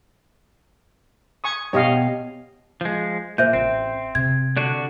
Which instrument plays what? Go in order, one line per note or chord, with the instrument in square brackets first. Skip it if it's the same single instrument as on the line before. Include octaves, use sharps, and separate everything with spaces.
[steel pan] G#5 C#6 D#6
[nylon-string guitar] B2 G4 [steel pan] C#5 D#5 F5
[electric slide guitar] F3 G#3
[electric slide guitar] A#2 [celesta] C5 E5 G6
[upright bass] A1 [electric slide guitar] C4
[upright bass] C3 [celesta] G#6
[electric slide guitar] D3 D4 F#4